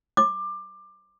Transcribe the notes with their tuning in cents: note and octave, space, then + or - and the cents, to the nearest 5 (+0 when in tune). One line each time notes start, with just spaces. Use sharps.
D6 +20